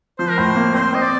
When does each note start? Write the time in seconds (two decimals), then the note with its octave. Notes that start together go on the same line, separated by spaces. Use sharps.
0.19 F3 C5
0.29 A#4
0.37 A2 C5
0.56 A#3
0.74 C4 C5
0.93 C4 D#5
1.02 D5